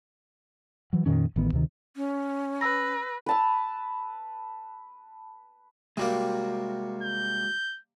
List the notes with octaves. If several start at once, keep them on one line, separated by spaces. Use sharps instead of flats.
E3 F#3
F2 A#2 D#3 C#4
A1 D#3 B3
D2 C3 D#3
C#4
B4 E6 A#6
B4 A5 E6
C3 G3 G#3 A#3 F#4 A#4
G6